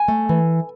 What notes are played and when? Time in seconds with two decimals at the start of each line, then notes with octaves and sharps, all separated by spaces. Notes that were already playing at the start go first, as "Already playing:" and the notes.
Already playing: G#5
0.08 A3
0.29 E3